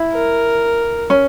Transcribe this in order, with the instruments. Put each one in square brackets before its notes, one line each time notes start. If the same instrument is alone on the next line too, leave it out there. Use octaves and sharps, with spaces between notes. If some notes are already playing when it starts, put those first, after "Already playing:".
Already playing: [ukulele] E4
[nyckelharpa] A#4
[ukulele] C#4